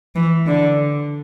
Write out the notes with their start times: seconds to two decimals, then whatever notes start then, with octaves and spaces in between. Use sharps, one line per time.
0.15 E3
0.46 D3